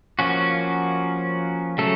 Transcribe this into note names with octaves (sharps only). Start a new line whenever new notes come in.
F3 A#3 C#4 F#4
C#3 F#3 A3 A4